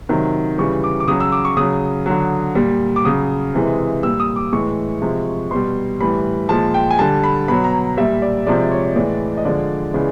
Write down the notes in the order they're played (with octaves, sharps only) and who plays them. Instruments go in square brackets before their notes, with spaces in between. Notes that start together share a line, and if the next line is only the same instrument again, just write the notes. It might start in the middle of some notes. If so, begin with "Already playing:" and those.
[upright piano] C3 D#3 F#3
C#3 E3 G3 C#6
D6
D6
C#3 F#3 D#6
E6
D6
C#6
C#3 F#3 D#6
D3 F#3
A#2 G3
D6
C#3 F#3 D#6
C3 E3 G#3
A#2 G3 E6
D#6
D6
A2 E3 G#3 C#6
C3 F3 G#3
B2 G3 C6
A2 E3 G3 B5
A#2 F3 G#3 A5
G5
G#5
D3 G3 A5
B5
B2 F#3 B5
A#5
A#2 G3 E5
D5
C3 F3 G#3 D5
C#5
C#5
A2 E3 G#3 D5
D#5
D3 F3 G#3 D5
C#3 E3 G#3